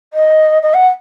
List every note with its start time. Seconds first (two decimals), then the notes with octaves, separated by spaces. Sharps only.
0.14 D#5
0.63 D#5
0.74 F#5